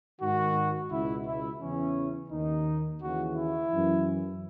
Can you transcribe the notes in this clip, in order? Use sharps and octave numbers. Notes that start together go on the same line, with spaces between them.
G#2 D#3 F#4
C#2 B2 E4
E4
E2 C#3 E3 C#4
D#2 D#3 D#4
D#2 C#3 E3 F#4
E4
F#2 E3